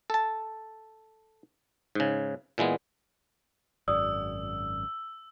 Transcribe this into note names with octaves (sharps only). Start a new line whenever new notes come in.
A4 A5
G#2 C#3
A#2 E3 G#3 B3
G#1 F#2 D5 D#6 E6